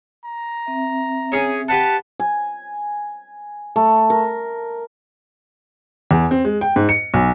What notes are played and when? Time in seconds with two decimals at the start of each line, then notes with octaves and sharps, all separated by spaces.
0.24 A#5
0.67 C4 E5
1.32 C#4 G#4 C#5
1.69 G4 B4 F#5 A5
2.20 G#5
3.76 A3
4.10 A#4
6.11 E2
6.31 C4
6.45 G#3
6.61 G5
6.76 G#2
6.89 C#7
7.14 B1